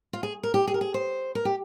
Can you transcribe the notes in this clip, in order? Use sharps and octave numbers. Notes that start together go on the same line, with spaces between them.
F4
G#4
A#4
G4
G#4
A#4
G#4
C5
A#4
G4